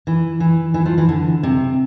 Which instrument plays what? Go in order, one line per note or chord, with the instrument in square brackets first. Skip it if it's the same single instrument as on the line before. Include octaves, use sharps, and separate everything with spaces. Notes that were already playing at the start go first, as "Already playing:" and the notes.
[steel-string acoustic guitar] E3
E3
E3
F3
E3
D3
C3